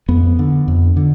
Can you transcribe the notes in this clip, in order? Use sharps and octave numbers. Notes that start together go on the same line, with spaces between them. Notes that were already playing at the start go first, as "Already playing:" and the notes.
F2 B3
D3
F2
D3